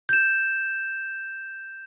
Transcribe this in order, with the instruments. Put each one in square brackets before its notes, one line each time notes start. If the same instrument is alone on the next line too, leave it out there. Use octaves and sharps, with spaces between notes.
[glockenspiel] G6 E7